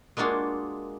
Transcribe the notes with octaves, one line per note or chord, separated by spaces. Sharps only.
G#3 A#3 D4 F4 F#4 G#4